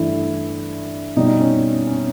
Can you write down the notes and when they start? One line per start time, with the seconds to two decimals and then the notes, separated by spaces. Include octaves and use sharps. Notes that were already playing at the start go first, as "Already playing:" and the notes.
Already playing: G2 E3 A3 E4
1.17 B2 G3 D#4
1.40 C#4
1.87 C#4